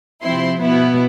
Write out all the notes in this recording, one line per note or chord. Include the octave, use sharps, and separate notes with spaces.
C3 F3 C4 E4 C6
B2 B3 E4